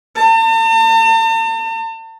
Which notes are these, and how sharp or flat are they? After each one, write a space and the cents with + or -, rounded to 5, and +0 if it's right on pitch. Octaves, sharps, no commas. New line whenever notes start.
A5 +45